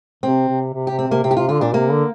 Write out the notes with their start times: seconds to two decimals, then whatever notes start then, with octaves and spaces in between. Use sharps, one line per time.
0.23 C3 C4
0.49 C3
0.74 C3
0.87 C3 G4
0.99 C4
1.08 C3 A#3
1.24 C3 C4
1.31 G4
1.37 C3 F4
1.49 D3 F4
1.61 A#2 D4
1.74 C3 A#3
1.91 D3